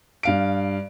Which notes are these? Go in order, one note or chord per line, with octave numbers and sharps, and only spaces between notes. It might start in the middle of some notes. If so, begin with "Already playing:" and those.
G2 F5 D7